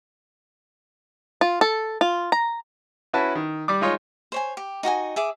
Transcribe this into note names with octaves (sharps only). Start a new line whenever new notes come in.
F4
A4
F4
A#5
C#4 E4 F#4 B4 A5
D#3
G3 D5 D6
G#3 D#4 F4 C#5
C5 C#5 G#5
G4
D#4 F#4 D#5 G#5
G#4 E5 D6